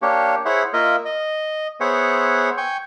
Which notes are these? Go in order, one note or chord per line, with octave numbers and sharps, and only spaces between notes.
A#3 D4 G4 C#5
E4 G#4 C5 C#5 E5 F#5
A#3 F4 A#4 D#5 E5
D#5
B3 G#4 C5 C#5 E5 F#5
G5 G#5 C#6